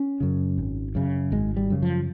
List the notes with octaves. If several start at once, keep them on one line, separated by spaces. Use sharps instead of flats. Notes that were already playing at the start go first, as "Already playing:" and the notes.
Already playing: C#4
F#2 C#3
G#1
F#2 C#3
G#1 G#3
G3
F#2 C#3
F3